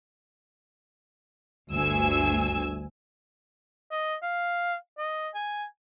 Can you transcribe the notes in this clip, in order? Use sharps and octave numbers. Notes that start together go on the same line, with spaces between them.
G1 D2 G#5 E6
D#5
F5
D#5
G#5